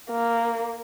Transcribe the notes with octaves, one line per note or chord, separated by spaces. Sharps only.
A#3